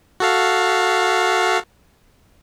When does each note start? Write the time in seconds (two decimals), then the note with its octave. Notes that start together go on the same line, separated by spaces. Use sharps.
0.20 F#4 A4 F5